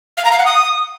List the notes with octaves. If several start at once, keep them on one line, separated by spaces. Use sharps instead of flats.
F5
A#5
F5
F#5
D#6